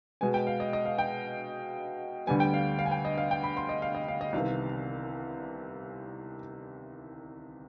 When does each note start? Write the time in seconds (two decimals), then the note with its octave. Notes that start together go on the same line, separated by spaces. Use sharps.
0.21 B2 G#3 B3 G#5
0.34 G5
0.47 F5
0.60 D#5
0.73 D#5
0.85 F5
0.99 G5
2.27 D2 D3 G3 B3 G#5
2.40 G5
2.54 F5
2.79 F5
2.86 G#5
2.91 G5
3.05 D#5
3.18 F5
3.31 G5
3.43 B5
3.57 C6
3.69 D#5
3.82 F5
3.95 D#5
4.08 F5
4.21 D#5
4.33 C2 C3 D#3 B3 F5